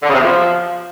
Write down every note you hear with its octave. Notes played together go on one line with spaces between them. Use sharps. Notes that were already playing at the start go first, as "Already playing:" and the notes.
D3
C#3
C3
E2
F3